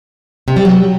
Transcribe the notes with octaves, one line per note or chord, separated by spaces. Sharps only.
C3
G3
F#3